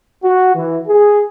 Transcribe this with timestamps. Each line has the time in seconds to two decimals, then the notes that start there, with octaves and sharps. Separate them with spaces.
0.23 F#4
0.55 E3
0.87 G#4